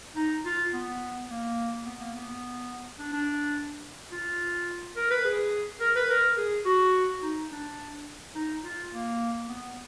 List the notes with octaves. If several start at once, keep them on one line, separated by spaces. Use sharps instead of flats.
D#4
F4
B3
A#3
B3
A#3
B3
D4
D4
F4
A#4
B4
G#4
A#4
B4
A#4
G#4
F#4
D#4
D4
D#4
F4
A#3
B3